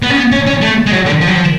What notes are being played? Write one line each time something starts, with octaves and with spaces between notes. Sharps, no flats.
B3
C#4
B3
C#4
C#4
A3
G#3
F#3
D3
F3
F#3
F3